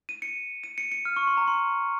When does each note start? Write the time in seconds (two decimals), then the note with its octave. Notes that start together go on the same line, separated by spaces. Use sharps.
0.09 D#7
0.22 C#7
0.64 D#7
0.78 C#7
0.92 C#7
1.05 F6
1.16 C#6
1.27 C6
1.37 A#5
1.48 C6